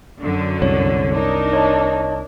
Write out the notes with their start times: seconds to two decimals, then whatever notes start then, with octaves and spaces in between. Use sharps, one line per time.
0.22 F#2 D3
0.62 C2 C#5
1.14 D4 D#4 A#4
1.53 C#5 D#5 A5